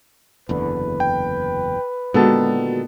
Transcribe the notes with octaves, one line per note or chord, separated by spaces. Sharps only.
F#1 E2 D3 B4
G5
A#2 D3 D#3 G#3 B3 F#4 A4 A5